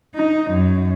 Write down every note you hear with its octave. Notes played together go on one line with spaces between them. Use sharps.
D#4
F#2